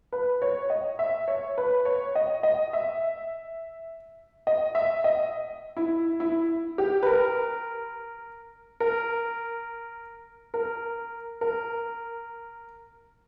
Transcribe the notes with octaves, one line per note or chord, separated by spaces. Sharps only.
B4
C#5
D#5
E5
C#5
B4
C#5
D#5
D#5
E5
D#5
E5
D#5
E4
E4
G4
B4
A#4
A#4
A#4
A#4